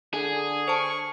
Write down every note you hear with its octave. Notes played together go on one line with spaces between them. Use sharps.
D3 G#4
C5 A5 C#6